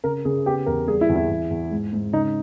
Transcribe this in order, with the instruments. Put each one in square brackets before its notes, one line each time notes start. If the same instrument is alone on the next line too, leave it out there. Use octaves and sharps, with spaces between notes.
[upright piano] C#3 A#4
C#3 G#4
B3 G4
E2 A#4
G3 G#4
E4
E2
E4
E2
E2
G#2
G#2
C#3 D#4